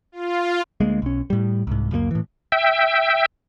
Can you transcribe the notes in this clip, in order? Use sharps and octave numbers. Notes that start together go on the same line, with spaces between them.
F4
D2 G#3 A#3
B1 C#4
A2 G3
C2 G#2
C#2 F#2 G3 A#3
A2 E3
E5 G5